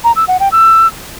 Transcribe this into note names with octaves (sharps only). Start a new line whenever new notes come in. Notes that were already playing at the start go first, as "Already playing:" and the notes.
A#5
E6
F#5
G5
E6